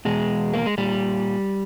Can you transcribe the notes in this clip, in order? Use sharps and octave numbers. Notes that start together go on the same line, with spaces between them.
E2 B2 G#3
A#3
G#3
A#2 G3